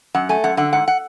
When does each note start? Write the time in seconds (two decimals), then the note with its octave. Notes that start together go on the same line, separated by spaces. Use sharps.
0.14 F#2 F#5
0.29 A3 G#5
0.44 F#2 F#5
0.57 D3 F#5
0.73 G#2 F#5
0.88 F#5